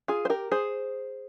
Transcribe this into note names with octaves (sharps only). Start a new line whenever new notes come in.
F4 G#4
C5
G4 A#4
G#4 C5